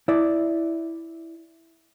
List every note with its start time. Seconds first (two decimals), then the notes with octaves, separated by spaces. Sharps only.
0.08 E4 D5